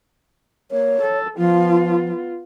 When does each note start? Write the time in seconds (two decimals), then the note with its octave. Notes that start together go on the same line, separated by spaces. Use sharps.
0.71 A#3 C#5
1.02 A4
1.38 F3 B3 F4